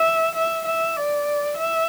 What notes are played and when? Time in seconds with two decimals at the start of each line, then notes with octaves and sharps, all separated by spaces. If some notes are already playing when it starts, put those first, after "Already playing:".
Already playing: E5
0.35 E5
0.66 E5
0.96 D5
1.57 E5